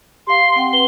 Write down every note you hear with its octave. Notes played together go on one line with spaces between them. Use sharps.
G4 F5 C6
C4 F#5 G5
B4 G7